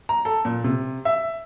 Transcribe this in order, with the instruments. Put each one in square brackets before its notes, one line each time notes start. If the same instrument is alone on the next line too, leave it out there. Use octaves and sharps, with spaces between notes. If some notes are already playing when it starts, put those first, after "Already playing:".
[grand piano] A#5
A4
A#2
C3
E5